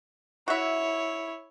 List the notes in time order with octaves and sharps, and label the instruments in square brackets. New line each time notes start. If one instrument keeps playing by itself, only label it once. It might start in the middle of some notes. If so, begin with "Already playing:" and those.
[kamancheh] E4 C#5 [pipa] F#4 E5